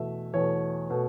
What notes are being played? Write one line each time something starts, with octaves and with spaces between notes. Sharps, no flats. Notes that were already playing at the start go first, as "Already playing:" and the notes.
Already playing: E2 B2 A3 E5
E2 B2 A3 C#5
B2 A3